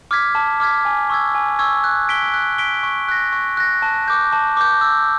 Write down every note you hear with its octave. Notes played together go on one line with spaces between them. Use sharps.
D6 F6 G#6 B6
A5
D6 F6 G#6 B6
G#5
C#6 E6 G#6
G#5
C#6 E6 G#6
F#6
B6 D7 G7
F#6
B6 D7 G7
C#6
F#6 A#6
C#6
F#6 A#6
A5
D6 G6
A5
D6 G6
E6